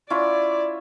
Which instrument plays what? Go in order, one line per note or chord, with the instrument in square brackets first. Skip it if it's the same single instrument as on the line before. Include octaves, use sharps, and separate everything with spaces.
[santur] C#4 E4 F4 [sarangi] D5